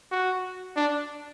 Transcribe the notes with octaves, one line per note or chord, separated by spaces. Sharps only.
F#4
D4